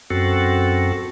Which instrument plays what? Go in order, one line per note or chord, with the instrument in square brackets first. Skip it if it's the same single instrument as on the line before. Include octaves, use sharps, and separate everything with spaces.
[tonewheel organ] F#2 C4 F#4 A4